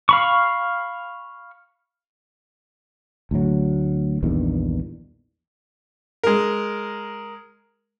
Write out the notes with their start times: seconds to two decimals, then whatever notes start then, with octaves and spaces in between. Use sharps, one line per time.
0.09 F5 B5 C#6
3.31 D2 A2 F#3
4.23 A#1 E2 G2 D#3
6.23 G#3 A#4